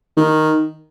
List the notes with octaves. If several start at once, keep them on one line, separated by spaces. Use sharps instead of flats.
D#3